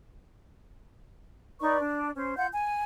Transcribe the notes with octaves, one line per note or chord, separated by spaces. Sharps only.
D#4 B4 D5 C#6
D4
C#4 C5
F4 F#5 G6
G#5